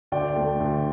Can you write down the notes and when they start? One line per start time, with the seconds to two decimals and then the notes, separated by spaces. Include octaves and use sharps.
0.12 D2 D5 G5
0.36 D3 A3
0.60 D2